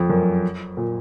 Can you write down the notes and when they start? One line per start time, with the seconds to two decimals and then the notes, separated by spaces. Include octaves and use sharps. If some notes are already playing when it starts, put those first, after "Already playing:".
Already playing: F2
0.10 F#2
0.77 A#2